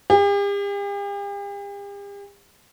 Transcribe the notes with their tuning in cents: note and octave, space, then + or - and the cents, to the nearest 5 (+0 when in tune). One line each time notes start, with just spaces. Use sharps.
G4 +45